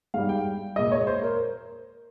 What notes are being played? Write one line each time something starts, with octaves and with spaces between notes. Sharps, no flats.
G#2 G3 F5
G5
A#2 G#3 D#5
C#5
C5
A#4